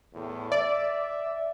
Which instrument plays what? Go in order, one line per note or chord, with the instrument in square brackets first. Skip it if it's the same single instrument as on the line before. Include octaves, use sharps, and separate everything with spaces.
[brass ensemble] E2 A2
[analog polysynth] D5 [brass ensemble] E5